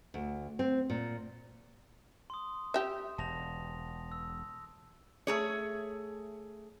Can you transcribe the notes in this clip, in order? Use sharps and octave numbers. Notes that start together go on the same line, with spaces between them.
D2
C4
A#2
C6 D#6
G4 E5
E1 A5 A#6 F7
E6
A3 G#4 C#5